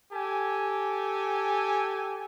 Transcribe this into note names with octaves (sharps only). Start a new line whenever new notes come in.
G4 A4 G#5